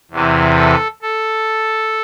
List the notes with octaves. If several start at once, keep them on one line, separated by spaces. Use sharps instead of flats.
E2 C3 E3
A4
A4